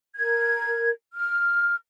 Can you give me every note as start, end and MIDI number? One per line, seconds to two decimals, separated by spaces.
0.16 0.90 70
0.16 0.90 92
1.14 1.75 89